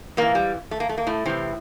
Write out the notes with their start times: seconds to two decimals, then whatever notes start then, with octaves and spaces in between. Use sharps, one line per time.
0.17 F2 A#2 E3 A#3
0.35 G3
0.71 A3
0.80 A#3
0.89 A3
0.98 A#3
1.07 A2 A3
1.26 A2 C3 E3 C4